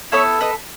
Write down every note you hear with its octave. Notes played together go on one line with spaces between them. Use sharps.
B3 E4 A4 C#5 E5
B4 D#5